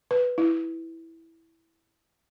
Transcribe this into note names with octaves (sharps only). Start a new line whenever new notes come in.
B4
E4